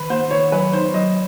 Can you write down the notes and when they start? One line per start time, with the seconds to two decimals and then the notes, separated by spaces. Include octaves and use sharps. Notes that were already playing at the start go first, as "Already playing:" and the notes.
Already playing: D#3 B4
0.10 A#3 C5
0.31 D#3 C#5
0.52 F#3 B4
0.73 D#4 C5
0.94 F#3 D#5